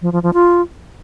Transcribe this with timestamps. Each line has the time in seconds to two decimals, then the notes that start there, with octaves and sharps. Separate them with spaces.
0.02 F3
0.12 F3
0.23 F3
0.34 F4